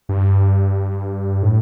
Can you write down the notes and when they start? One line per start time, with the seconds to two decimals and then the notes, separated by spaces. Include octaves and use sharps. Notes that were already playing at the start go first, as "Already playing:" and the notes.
0.09 G2
1.42 A2